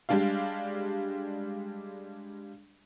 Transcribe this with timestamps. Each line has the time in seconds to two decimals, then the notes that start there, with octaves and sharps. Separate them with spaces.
0.09 G3 G#3 D4 G4 F5